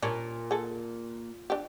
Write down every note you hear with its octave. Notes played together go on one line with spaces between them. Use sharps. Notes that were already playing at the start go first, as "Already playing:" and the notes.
A#2 G3 C#4 D4
G#4 A4
D4 G4